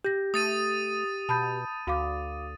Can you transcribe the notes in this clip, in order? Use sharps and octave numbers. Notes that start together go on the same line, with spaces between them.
G4 G6 A#6
A3 D#6 A6 D#7
B2 A5 B5 G6
D2 F#4 F5 D6